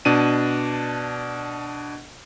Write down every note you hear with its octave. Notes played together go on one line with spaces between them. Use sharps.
B2 D4 D#7